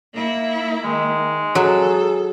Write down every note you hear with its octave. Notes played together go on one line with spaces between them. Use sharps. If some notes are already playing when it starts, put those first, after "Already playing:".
A#3 E4
D#3 G#3
F#3 G#4 A4